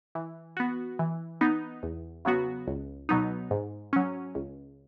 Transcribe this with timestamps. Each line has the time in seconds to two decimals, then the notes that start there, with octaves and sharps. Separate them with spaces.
0.15 E3
0.57 B3 F#4
0.99 E3
1.41 B3 D#4
1.83 E2
2.25 C#3 F#3 B3 F#4
2.67 C#2
3.09 B2 F#3 B3 D#4
3.51 G#2
3.93 F#3 C#4
4.35 C#2